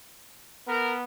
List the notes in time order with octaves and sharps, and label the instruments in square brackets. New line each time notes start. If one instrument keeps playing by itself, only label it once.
[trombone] B3 [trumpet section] A#4